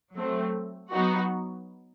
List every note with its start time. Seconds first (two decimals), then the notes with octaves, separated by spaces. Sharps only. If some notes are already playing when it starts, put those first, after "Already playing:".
0.15 F#3 A3 C4
0.91 F#3 B3 D#4 F#4